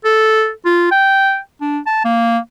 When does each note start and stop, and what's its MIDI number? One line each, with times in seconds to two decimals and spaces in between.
0.05 0.50 69
0.65 0.87 65
0.92 1.39 79
1.61 1.79 62
1.87 2.03 81
2.05 2.39 58